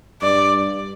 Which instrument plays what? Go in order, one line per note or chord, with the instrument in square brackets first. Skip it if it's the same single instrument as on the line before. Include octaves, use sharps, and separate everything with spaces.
[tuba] G2 [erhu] D5